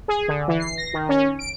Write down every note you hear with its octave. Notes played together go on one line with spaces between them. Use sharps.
G#4
D3
E3
C7
A#6
D#3
C#4
D7